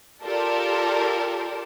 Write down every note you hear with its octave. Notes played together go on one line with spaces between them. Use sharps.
F4 G4 A4 A#4 D5